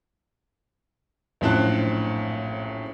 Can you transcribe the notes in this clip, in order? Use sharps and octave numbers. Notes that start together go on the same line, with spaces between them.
A#1 F#2 A2 C4 A5 F#6